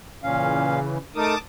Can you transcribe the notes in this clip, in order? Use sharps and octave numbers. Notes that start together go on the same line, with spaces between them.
A#2 C#3 E3 C#4 F5
A3 D#4 A#4 A5 D6 D#6